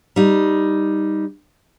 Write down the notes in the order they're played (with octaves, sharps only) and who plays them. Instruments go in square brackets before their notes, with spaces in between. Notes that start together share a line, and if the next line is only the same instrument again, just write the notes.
[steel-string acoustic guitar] G3 D#4